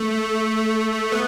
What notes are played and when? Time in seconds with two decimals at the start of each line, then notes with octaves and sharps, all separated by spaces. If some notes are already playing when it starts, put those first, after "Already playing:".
Already playing: A3
1.12 B3